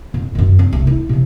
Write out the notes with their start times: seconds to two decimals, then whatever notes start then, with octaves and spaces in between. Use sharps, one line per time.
0.14 F2
0.35 F#2 D#3
0.59 C4
0.73 C2 A3
0.87 E4
1.09 C3 F3